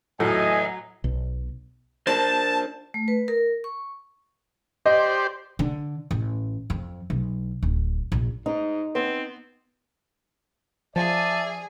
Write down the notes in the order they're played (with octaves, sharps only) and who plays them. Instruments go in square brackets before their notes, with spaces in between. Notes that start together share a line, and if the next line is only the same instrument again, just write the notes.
[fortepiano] A2 [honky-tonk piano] F#3 [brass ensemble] D#5 G#5 [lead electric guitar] E5 F#5
[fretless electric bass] B1
[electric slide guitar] D4 A#4 C5 [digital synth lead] A5
[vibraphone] A3
B4
A#4
C#6
[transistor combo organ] G4 C5 D5 [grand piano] D#5
[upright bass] D3
A1
F2
B1
D1
A#1
[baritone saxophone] G#2 [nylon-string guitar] D#4
[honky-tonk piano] B3 [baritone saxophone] C4
[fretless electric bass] F3 [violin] G#4 G#5 [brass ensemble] D5 E5 [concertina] A5